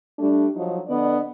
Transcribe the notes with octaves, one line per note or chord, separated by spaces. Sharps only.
G3 A3 D4
F3 F#3 D#4
D3 B3 D5 D#5